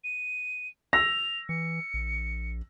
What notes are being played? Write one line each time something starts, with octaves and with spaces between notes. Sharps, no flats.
D#7
E6 A#6 F7
E3 C#7
A#1